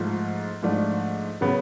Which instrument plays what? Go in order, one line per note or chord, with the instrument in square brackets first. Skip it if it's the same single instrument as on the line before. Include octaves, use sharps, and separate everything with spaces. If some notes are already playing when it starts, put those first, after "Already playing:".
Already playing: [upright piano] G#2 F3 A3 F4
G#2 F3 A3 D4
C#3 F#3 B3